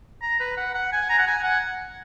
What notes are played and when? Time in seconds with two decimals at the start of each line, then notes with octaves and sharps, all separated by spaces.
0.22 A#5
0.40 B4
0.57 F#5
0.74 F#5
0.92 G#5
1.09 A#5
1.18 F#5
1.27 G#5
1.43 F#5